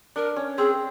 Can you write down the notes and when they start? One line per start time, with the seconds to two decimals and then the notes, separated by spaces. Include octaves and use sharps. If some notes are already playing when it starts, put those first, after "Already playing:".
0.16 D4 A#4
0.36 C#4
0.57 C4 G#4